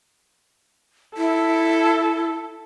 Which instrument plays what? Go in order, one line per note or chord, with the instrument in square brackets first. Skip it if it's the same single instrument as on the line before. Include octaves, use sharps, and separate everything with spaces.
[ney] E4 [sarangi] A4